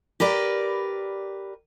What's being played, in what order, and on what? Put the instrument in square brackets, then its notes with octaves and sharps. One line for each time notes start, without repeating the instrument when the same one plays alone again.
[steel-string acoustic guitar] G4 A#4 B4 D5